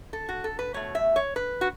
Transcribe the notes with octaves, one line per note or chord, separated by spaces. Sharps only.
A4
F#4
A4
B4
B2 A3 C#5
E5
C#5
B4
F#4